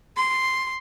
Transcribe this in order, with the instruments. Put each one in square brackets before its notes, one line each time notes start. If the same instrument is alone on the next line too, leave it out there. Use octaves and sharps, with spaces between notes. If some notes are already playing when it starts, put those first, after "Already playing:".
[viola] C6